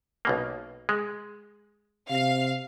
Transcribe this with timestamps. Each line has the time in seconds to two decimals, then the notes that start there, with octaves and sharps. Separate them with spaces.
0.25 B1 B2 A#3
0.89 G#3
2.10 C3 F5